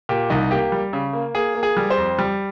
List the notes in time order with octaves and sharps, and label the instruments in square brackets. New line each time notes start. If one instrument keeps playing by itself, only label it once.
[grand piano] A#2 G4
C2 D#4
A#3 G4
G3
C#3
A#3
A#3 G#4
A#3
G#4
G3
C5
F2
G3